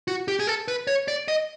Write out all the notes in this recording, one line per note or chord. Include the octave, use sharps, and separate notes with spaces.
F#4
G4
G#4
A4
B4
C#5
D5
D#5